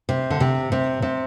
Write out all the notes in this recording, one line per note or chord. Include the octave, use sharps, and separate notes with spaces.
C3
D3
C3
C3
C3